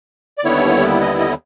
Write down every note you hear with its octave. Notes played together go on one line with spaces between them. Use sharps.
D5
D#2 D3 G3 B3 E4 C#5
D#5
D#5